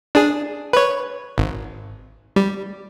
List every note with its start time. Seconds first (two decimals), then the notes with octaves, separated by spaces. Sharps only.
0.15 D4 G#4
0.73 B4 C#5
1.38 G#1
2.36 G3